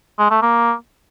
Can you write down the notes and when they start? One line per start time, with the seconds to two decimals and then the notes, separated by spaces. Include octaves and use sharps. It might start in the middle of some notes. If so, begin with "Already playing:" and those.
0.19 G#3
0.30 A3
0.42 A#3